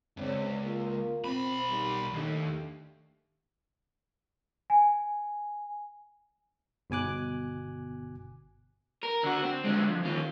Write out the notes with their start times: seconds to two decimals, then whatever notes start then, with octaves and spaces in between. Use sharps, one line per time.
0.17 C#2 G2 C4 C#5 D5
0.63 A#3 F4
1.24 B1 C4 B5
1.69 D#3 G3
2.14 D#2 A3 D4 G4
4.70 G#5
6.90 G1 B2 G#5 D6 F#6
9.03 A#4
9.24 D3 F#4
9.43 C4
9.65 D3 G#3
9.89 F2
10.04 D#2 F4